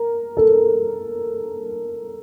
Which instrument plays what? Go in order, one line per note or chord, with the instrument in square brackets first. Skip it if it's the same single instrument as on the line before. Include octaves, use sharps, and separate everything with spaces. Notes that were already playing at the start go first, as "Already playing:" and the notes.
Already playing: [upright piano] A#4
A4